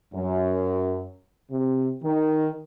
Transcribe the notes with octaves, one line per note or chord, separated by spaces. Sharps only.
F#2
C3
D#3